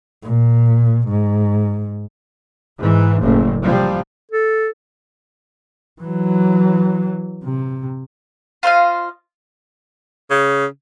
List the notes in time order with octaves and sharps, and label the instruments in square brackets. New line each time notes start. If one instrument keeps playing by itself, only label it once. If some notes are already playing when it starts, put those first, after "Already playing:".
[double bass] A#2
G#2
[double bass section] G#2 E3
F#1 A2
C3 F3 G3
[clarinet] A4
[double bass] E3 F#3
C3
[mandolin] F4 C5 D#5 F5
[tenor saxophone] C#3